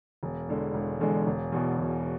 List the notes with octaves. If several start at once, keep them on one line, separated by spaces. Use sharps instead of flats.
E1
E2 D3 G#3
E1
E2 D3 G#3
E1
E2 B2
E1